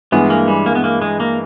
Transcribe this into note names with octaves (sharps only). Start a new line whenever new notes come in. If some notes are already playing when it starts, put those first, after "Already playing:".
G2 E3 G#3 B3
A#3
G3
A#3
B3
A#3
G#3
A#3